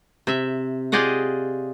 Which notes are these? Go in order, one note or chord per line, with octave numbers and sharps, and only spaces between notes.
C3 E5
F4 G4 G#4 D5 D#5 F#5